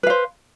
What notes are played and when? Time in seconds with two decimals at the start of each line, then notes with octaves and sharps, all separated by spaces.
0.03 B4
0.07 F5
0.10 C5